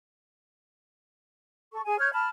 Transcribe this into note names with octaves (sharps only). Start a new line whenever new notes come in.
A4 C#6
G#4 G#5
C#5 F6 G6 G#6
A5 B5 F6